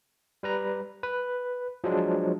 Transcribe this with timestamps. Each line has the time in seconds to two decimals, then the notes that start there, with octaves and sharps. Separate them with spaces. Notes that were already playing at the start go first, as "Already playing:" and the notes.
0.43 G3 B4 A#5
1.03 B4
1.84 F3 F#3 G#3 D4